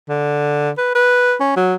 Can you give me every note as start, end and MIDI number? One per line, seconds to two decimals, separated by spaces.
0.09 0.70 50
0.78 0.92 71
0.95 1.35 71
1.40 1.55 61
1.57 1.75 54